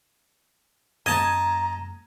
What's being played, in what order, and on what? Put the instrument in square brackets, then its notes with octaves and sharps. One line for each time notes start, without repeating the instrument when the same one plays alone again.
[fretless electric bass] F#2 A#3 C#4 [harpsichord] D#5 A5 [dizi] A#5 [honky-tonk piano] G#6